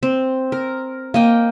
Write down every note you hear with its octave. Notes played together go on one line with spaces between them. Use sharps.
C4
A#4
A#3 D#5 G5